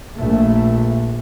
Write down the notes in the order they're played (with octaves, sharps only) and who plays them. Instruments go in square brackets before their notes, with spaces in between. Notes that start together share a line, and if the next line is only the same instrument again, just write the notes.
[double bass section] A#1 A3